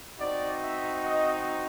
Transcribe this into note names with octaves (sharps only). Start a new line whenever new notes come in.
C4 D#4 F#4 D5
E5
D#5